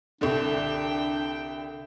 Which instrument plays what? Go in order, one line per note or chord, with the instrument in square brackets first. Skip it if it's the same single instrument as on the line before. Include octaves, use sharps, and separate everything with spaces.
[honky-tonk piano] C2 D3 [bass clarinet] D4 [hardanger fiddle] G5